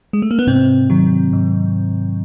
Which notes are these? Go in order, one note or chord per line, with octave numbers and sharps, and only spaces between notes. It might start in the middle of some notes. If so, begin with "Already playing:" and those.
G#3
A3
A#3
B3
G#2 C3 C4
D#3 F#3
G#2